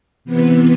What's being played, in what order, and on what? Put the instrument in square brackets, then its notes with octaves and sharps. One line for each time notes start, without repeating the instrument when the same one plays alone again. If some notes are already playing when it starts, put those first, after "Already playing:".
[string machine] C3 E3 B3